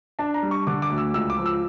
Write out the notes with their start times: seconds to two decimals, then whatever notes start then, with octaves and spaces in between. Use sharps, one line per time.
0.19 D4 A5
0.34 A#5
0.43 G3
0.51 C#6
0.67 D3 D6
0.82 D6
0.90 D2
0.98 E6
1.14 C#2 E6
1.30 D6
1.38 F3
1.46 E6